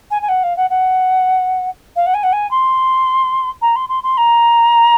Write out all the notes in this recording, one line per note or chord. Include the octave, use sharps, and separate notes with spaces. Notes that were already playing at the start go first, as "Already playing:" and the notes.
G#5
G#5
F#5
F5
F#5
F#5
F5
F#5
G#5
F#5
G#5
C6
A#5
C6
C6
C6
A#5